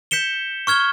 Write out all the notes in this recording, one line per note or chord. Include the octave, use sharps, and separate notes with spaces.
G6 B6 C#7 E7 G7
C#6 F6 G#6 G7